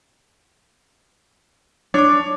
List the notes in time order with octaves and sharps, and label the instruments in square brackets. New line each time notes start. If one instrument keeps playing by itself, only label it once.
[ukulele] D4 [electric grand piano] C#5 D6